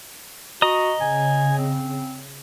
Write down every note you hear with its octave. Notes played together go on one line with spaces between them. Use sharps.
F#4 D#5 A#5 D#6
C#3 G#5
C4